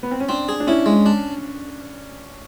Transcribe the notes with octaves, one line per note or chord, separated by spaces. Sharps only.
B3
C4
C#4
C4 D4
G#4
D4
C#4 E4
G#3
D4